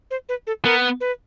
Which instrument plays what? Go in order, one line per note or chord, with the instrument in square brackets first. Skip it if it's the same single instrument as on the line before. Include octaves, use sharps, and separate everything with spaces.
[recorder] C5
B4
A4
[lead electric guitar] B3 [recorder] A#4
[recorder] B4